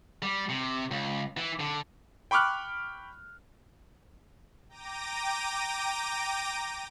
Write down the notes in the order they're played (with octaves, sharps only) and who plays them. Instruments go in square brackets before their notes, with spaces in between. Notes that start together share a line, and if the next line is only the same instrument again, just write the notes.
[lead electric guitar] G3
C3
C#2
E3
D3
[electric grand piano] G5 B5 C#6 D6 F6 F#6
[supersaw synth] G5 A#5 D6 A#6 D#7